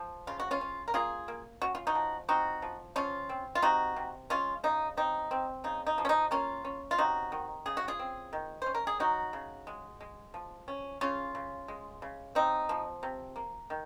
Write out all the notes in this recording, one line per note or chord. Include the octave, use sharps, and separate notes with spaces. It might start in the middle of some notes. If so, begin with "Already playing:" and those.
Already playing: F3
C#3 F4
F#4
C#4 F4
C#4
A#4
A#3 F4 G#4
A#3
C#4 F#4
F4
D#4 F#4
F3
C4 D#4 F#4
F3
F3 C#4 F4
C4
F4
C3 D#4 F#4
C3
G#3 C#4 F4
C#3 D#4
C4 D#4
C4
C#3 D#4
D#4
F3
C#4
D#4
A#3 C#4 F4
C#4
F4
C3 D#4 F#4
D#3
C#3 G#4
F#4
F4 G#4
C4
D#3
C#4 C5
A#4
G#4
F#3 D#4 F#4
C#3
G#3
G#3
F3
C#4
C#3 C#4 F4
C#3
G#3
C#3
C4 D#4
F3
C3
A#3
D#3